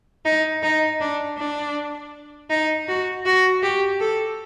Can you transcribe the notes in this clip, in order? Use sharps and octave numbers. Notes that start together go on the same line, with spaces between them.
D#4
D#4
D4
D4
D#4
F#4
F#4
G4
A4